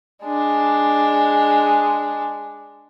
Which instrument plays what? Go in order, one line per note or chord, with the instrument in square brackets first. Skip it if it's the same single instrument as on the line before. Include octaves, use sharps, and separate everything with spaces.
[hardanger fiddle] G#3 D4